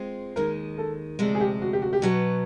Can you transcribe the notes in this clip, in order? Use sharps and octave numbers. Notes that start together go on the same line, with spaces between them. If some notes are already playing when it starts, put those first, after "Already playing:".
Already playing: G#3 C4 F4
D#2 D#3 G#3 A#4
A4
D2 C3 F3 G#3
G#4
G4
F#4
G4
F#4
G4
B2 F#3 B3 F#4